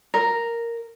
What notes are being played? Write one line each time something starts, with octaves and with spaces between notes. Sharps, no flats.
A#4